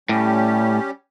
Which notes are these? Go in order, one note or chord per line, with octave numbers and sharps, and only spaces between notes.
A2 G3 C#4 G4